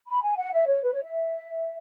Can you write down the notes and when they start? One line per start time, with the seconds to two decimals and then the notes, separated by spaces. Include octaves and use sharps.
0.08 B5
0.22 G#5
0.37 F#5
0.53 E5
0.67 C#5
0.83 B4
0.93 C#5
1.03 E5